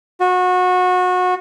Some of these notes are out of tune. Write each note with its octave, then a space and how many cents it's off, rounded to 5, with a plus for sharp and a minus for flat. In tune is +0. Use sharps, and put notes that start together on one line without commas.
F#4 -25